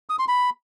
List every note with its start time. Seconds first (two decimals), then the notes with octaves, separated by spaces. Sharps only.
0.10 D#6
0.19 C6
0.28 B5